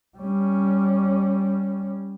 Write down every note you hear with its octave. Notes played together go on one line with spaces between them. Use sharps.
G3 C#4